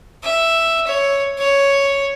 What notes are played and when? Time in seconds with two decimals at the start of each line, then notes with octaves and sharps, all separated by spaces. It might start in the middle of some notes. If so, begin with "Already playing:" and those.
0.23 E5
0.87 C#5
1.39 C#5